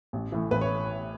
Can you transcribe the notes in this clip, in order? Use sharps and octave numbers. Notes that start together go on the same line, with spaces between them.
A1
A2 E3
A1 B4
C#5